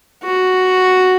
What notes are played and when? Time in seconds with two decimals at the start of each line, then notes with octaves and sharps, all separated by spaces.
0.24 F#4